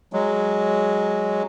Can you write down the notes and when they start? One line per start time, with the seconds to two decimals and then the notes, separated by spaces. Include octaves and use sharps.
0.13 F#3 G#3